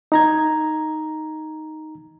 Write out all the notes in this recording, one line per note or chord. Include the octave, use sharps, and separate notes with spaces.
D#4 A#5 G#6